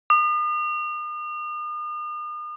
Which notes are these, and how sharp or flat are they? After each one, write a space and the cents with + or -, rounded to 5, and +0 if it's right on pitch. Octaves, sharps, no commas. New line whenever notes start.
D#6 -40